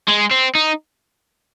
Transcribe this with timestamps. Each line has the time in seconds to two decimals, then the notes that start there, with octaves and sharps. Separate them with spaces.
0.08 G#3
0.31 C4
0.55 D#4